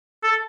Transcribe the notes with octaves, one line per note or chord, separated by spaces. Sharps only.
A4